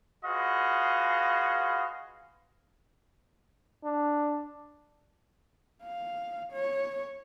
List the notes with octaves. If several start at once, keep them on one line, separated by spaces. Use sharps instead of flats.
F4 F#4 G#4 B4 D#5 F5
D4
F5
C#5